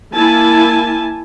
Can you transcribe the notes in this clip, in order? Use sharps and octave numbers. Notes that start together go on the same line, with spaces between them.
A#3 E4 G#5 A5